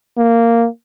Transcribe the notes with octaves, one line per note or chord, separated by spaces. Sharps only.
A#3